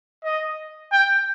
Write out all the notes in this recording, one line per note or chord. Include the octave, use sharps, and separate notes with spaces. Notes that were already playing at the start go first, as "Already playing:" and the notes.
D#5
G5